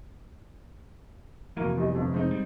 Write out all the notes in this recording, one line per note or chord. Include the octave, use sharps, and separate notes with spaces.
F1 E3 A#3 F#4 A#4
E2 G3 D#5
G1 F2
G#3 C4 D#4
G3